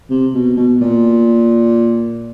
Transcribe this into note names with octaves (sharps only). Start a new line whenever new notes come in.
C3
B2
B2
A#2